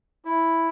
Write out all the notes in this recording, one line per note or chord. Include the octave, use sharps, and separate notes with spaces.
E4